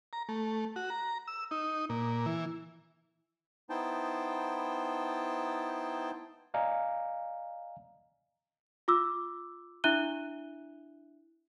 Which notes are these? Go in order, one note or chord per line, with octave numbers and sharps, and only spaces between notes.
A#5
A3
F#4
A#5
E6
D#4
A#2
E3
B3 D#4 E4 C5 G5 A5
D5 D#5 F5 G#5 A#5
F4 D6 E6
D4 E4 E5 F#6 D#7 G7